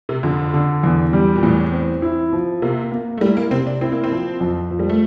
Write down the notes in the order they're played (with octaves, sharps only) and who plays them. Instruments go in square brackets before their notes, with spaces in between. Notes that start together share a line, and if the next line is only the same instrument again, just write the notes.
[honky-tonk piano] C3
[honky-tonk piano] F2 [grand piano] D3
[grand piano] D3
E2
G3
[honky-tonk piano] A#2
[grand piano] E2 [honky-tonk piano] A2
[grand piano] C4
E4
F3
[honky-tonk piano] C3 [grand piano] A#3
[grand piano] A#3
[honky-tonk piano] A3
[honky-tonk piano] G3 [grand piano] E4
[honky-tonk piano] A#3
[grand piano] C3 [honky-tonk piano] C4
[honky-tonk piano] D4
[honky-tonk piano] C4 [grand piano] E4
[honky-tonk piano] A#3
C4
[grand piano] F3
F2
F3
[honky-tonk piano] G3
A3